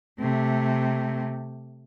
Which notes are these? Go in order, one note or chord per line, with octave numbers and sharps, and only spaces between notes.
C3 A3